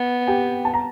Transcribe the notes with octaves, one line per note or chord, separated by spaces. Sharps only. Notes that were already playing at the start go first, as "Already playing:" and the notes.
Already playing: B3
G4 G5
A5
A#5